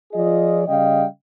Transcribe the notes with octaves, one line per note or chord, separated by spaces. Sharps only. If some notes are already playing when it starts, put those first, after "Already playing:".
F3 F4 G#4 D5 D#5
C#3 G3 D#5 F5 G5